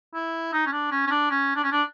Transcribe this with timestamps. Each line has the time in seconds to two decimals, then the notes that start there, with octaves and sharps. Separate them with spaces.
0.14 E4
0.53 D#4
0.67 C#4
0.72 D4
0.91 C#4
1.07 C#4
1.11 D4
1.30 C#4
1.56 D4
1.64 C#4
1.72 D4